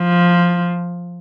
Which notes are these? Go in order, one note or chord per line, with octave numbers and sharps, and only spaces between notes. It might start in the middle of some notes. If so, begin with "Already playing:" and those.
Already playing: F3